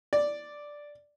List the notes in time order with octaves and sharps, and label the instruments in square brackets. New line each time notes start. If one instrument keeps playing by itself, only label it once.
[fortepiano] D5